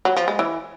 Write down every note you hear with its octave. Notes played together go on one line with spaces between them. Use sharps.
F#3
F3
G#3
E3